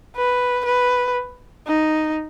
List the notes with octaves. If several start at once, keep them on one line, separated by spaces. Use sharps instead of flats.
B4
B4
D#4